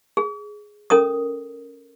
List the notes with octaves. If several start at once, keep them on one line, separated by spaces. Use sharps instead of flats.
G#4
C#4 A4 A#4 D#6